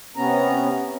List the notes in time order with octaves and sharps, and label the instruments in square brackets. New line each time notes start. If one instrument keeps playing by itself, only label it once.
[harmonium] C3 B3 C#4 A#5